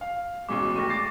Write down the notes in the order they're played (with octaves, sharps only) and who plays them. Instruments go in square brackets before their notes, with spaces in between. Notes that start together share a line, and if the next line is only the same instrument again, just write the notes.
[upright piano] F5
[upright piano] A1 B2 G#3 [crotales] C#6 D6
[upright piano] F1 A3 [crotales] C#6 A#6
[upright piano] D6 A6 C7